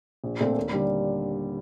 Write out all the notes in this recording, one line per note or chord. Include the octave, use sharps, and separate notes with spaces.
A#1
A#2 A3 C4
D#2
D3 G3